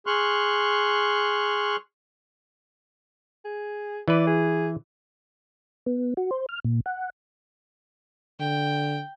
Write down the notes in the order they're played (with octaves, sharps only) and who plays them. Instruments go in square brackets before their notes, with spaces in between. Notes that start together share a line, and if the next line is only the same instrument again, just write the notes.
[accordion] G#4 C6 C#6 F6 F#6
[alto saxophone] G#4
[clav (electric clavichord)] E3 B4 [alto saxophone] D5
[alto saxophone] G#4
[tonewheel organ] B3
F#4
C5
F6
A#2
F#5
[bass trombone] D3 [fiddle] G5